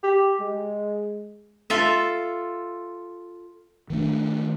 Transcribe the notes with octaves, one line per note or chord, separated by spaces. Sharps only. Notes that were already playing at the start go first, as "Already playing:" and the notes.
G4
G#3
F4 A4 E5
D#3 A3 D4